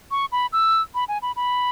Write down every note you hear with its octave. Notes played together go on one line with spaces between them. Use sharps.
C#6
B5
E6
B5
G#5
B5
B5